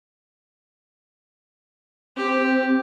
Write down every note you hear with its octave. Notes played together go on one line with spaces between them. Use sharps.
C4 G4